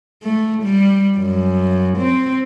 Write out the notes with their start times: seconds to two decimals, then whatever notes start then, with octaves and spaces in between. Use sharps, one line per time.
0.23 A3
0.63 G3
1.17 F#2
1.98 C4